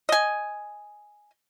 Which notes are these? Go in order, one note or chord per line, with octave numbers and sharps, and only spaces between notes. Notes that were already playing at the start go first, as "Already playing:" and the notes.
D#5 G#5